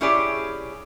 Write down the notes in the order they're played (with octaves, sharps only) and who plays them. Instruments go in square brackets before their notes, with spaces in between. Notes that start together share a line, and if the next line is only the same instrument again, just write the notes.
[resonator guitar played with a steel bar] C#4 E4 G4 G#4 C#5 D5